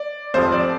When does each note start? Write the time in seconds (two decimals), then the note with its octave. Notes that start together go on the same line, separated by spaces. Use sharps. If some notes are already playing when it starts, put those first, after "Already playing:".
Already playing: D5
0.34 F1 F2 F3 C5
0.52 D5